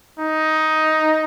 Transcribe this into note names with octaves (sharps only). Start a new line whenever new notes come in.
D#4